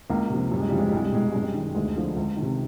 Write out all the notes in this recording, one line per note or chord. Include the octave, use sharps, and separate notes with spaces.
C#2 A#3
C3 F3
F#2 G3
G#3
C#3 F3 G3
G#3
G3
C2 G#3
G3
B2 G#3
G3
F#2 G#3
G3
D#3
D2 G#3
D3 F3
C#2
D#3
C3